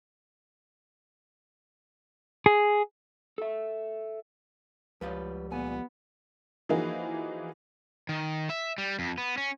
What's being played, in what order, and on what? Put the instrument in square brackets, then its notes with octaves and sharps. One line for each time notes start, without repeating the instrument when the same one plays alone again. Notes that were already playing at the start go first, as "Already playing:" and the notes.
[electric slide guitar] G#4
A4 E5
[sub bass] C#2 [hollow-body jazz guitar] F3 G3 F5 [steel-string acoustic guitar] C#4 B4
[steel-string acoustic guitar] D2 A#2 G#5 [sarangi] B3
[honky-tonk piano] E3 F3 A#3 D#4 F#4 G#4
[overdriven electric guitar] D#3
E5
G3
F2
B3
C#4